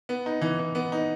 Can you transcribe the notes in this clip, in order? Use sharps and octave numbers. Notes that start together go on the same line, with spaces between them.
B3
D#4
E3
E3
B3
D#4